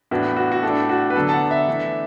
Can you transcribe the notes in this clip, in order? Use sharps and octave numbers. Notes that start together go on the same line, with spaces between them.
A2 E3 B3 D4 F#4
F#4
F#4
A2 A3 D4 A4
F#4
B4
D3 F#3 B3 D4 A4
A5
F#5
E5
E3 A3 D4